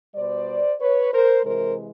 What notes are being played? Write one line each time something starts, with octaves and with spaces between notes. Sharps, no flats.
B2 G3 C5 D5
B4 C#5
A#4 C5
C3 E3 G#3 A#4 C5